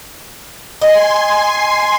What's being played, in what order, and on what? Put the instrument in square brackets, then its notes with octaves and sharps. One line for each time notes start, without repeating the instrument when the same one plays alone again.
[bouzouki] D#5 [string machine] G#5 C6